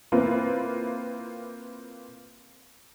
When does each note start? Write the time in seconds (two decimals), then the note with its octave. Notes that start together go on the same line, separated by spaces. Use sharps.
0.12 A#3 C4 E4 F4 B4